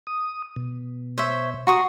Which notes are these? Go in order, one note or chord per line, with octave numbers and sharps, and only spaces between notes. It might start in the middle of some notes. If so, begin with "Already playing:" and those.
D#6
B2
C5 C#5 E5
F#4 F#5 A#5 C6 C#6 D#6